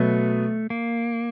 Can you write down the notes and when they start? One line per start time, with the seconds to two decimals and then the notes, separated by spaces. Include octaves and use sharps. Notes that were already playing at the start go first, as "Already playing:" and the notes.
Already playing: B2 F#3 A3 B3
0.70 A#3